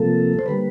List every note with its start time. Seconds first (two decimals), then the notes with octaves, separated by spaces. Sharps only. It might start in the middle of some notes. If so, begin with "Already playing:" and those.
Already playing: C3 F3 A#3 A4
0.39 C5
0.46 D3 G3 A#3 B4